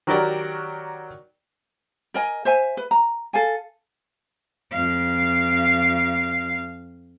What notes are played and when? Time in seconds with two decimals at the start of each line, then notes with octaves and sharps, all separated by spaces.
0.07 D#3 F#3 F#4 G4 A#4 D5
2.14 A#4 D#5 G#5
2.45 C5 E5 G#5
2.77 B4
2.91 A#5
3.33 A4 F5 G#5
4.72 F2 F5